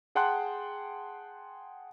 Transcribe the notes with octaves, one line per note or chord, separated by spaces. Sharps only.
G#4 F#5 G5 A5 C6 F#6